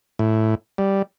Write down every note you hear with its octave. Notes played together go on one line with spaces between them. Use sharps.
A2
G3